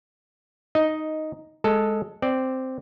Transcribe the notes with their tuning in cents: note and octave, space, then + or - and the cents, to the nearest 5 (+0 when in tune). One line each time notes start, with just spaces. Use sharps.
D#4 +0 D#5 +5
G#3 +5 A4 +0 A5 +0
C4 -5 D5 +0